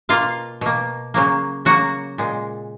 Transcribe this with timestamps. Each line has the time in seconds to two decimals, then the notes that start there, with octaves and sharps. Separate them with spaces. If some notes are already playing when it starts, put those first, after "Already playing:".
0.09 B2 A#3 F4 F5
0.61 B2 A#3
1.14 C#3 F#3 A#3
1.65 C#3 F#3 A#3 F#4 F#5
2.18 A#2 G#3